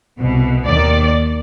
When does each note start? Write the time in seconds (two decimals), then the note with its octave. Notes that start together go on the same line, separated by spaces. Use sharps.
0.18 C2 B2
0.66 D#2 D#3 D5